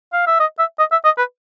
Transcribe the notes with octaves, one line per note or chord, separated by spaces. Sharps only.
F5
E5
D#5
E5
D#5
E5
D#5
B4